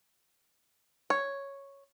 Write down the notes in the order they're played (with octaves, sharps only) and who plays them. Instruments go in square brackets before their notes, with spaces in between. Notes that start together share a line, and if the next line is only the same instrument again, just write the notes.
[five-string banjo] C#5